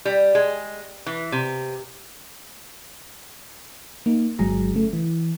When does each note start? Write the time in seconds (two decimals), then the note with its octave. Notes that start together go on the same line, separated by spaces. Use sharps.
0.05 G3
0.35 G#3
1.06 E3
1.32 C3
4.06 A#3 D#4
4.39 G1 F#3 G#3 G#4 A#5
4.74 C#3 A3
4.93 E3